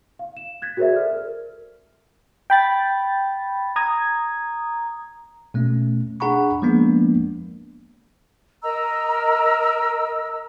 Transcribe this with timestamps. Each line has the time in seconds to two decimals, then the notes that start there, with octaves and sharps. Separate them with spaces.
0.19 F5
0.37 E7
0.62 F#6 G#6 A6 B6
0.77 F#4 G#4 A#4 C5 D5 E5
0.95 A4 F6
1.11 A#4
2.50 G5 B5 A6
3.76 A#5 D#6 G#6
5.54 B2 A3 C#4
6.20 D4 G#4 F#5 A#5 B5 C#6
6.62 F3 G#3 A#3 B3 D4
8.63 A#4 D#5 A#5 E6